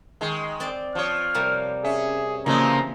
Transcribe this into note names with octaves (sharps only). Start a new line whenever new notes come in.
D#3 G#3
C4 D5 C6
F3 C#5 F6
C3 G3 A#3
C#4 G#4 E5
A#2 C#3 E3 F3 G#3 A#3 C4 A#5